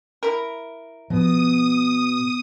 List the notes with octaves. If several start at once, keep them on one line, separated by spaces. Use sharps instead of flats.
E4 A#4
B2 F3 D#6